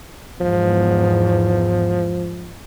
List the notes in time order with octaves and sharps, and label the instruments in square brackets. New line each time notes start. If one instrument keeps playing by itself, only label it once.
[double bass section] E2 G#2 [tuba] F3